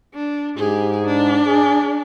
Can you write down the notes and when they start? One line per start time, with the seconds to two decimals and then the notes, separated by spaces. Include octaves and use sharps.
0.14 D4
0.57 G#2 G4 G#4
1.05 D4
1.47 G#4